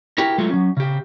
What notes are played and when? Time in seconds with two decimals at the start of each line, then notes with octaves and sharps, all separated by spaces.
0.18 E4 F#4 G4 A#4
0.38 F#3 G#3 A3 F4
0.50 F#3 C#4
0.77 C#3 G4